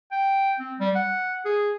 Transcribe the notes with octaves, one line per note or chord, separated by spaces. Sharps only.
G5
C4
G3
F#5
G#4